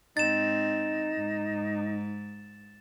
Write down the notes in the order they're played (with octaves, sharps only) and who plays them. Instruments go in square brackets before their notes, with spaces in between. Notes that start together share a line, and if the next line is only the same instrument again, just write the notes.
[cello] G#2 C4 [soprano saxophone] D#4 [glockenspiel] A6 E7
[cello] G#2